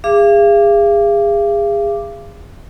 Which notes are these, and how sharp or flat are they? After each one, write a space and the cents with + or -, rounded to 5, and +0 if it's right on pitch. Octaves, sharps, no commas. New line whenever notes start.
G#4 -30 F5 -40 D6 +0